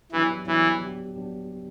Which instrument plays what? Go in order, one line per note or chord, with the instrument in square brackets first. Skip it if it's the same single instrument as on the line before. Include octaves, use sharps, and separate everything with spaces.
[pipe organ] E3 [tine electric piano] F#3 B3 D4 G4
[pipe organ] E3 [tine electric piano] F#3 B3 D4 G4
[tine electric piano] F#3 B3 D4 G4
F#3 B3 D4 G4